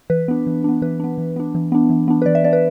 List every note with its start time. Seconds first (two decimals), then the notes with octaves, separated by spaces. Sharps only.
0.10 E3 B4
0.28 B3 D4
0.47 E3
0.64 B3 D4
0.82 E3 B4
1.00 B3 D4
1.18 E3
1.36 B3 D4
1.55 E3
1.72 B3 D4
1.90 E3
2.08 B3 D4
2.22 B4
2.26 E3 D5
2.35 E5
2.44 B3 D4 D5
2.53 B4